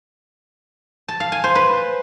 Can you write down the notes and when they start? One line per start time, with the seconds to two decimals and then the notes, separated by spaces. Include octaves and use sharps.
1.08 A5
1.20 F5
1.32 G#5
1.44 C5
1.55 B4